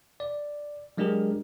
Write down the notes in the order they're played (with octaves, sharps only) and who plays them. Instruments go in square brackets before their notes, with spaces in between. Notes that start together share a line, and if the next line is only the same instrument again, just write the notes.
[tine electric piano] D5
F#3 G#3 D4 G4 G#4 A#4